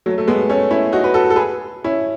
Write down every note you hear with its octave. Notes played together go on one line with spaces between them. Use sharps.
F#3 A3
A3
G#3 B3
A3 C#4
C#4 E4
D#4 F#4
B4
F#4 A4
A4
G#4 B4
C#4 E4